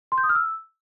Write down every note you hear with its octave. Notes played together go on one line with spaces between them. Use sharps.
C6
G6
D#6
F6
E6